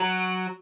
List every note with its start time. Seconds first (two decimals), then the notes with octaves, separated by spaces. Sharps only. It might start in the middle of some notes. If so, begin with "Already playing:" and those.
Already playing: F#3